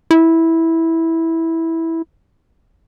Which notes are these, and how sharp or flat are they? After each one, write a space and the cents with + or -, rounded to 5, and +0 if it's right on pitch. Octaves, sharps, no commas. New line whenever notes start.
E4 -10